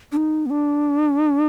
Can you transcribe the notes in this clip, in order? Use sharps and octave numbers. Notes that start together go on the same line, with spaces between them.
D4
D#4
B3
D4